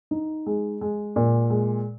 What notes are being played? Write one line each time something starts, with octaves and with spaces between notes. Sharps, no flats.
D#4
G#3
G#3
A#2
G#3